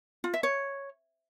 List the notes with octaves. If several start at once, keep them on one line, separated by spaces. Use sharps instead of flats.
F4
E5
C#5